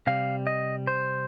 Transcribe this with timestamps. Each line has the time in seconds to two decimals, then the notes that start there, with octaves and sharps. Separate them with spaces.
0.07 C3 G3 F5
0.47 D#5
0.87 C5